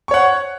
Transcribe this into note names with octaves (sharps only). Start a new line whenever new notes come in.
C#5 F#5 C#6